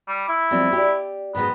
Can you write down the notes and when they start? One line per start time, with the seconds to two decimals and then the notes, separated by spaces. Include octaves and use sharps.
0.08 G3
0.29 E4
0.51 F3 G3 C4
0.72 G4 D5
1.35 G#2 D#3 G#3 B3